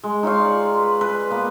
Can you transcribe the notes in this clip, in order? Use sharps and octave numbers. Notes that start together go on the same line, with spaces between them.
G#3
D#4 F4 C#5 F5
D5
B4
B4
A#3 B3